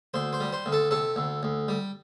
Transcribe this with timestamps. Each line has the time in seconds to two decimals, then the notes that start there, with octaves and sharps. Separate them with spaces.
0.14 D2 C5
0.33 C5
0.40 G3
0.53 C5
0.66 D2
0.72 A4
0.91 C3 A4
1.16 D2
1.43 D2
1.68 G3